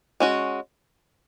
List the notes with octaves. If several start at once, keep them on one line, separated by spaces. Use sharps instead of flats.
G#3 C#4 F#4